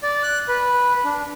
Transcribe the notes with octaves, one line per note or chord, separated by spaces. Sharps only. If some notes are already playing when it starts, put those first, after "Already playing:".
D5
F#6
B4
D4